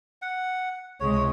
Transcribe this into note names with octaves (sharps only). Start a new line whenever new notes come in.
F#5
C#2 C3 G#3 C#5